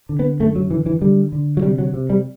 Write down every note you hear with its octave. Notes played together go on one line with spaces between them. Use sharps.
D3
B3
F#2 A3
F#3
D3 E3
E3
D3 G3
D3
F#3
C3 G3
F#3
C3
G3